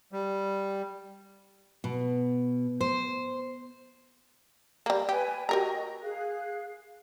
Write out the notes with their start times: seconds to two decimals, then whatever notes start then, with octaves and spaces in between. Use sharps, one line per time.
0.12 G3
1.84 B2
2.81 C5
4.86 G3 A#3
5.09 G4 B4 D5 G#5
5.49 F#4 G4 A#4 D#5 A#5
6.02 G#4 F5 F#6